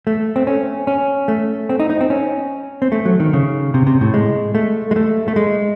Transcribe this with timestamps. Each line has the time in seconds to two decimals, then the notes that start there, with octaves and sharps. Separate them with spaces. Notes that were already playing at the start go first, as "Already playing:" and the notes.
0.07 A3
0.36 C4
0.47 C#4
0.87 C#4
1.28 A3
1.69 C4
1.80 D#4
1.90 D#4
2.01 C4
2.10 C#4
2.82 C4
2.92 A3
3.05 F#3
3.20 D#3
3.33 C#3
3.74 C3
3.87 C3
4.01 A2
4.14 G#3
4.55 A3
4.91 G#3
4.96 A3
5.28 A3
5.36 G#3